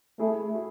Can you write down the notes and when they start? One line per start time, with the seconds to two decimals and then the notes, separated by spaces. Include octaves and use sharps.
0.19 A3 E4 G#4
0.55 F#4